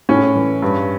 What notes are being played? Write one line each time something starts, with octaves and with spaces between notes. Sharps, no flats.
A2 C#4
E3
G2